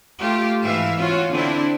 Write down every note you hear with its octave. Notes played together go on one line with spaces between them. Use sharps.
A3 F4 G4
G#2 E3 E5 F5
C#4 F4 F#4 C#5
D3 C4 D4 E4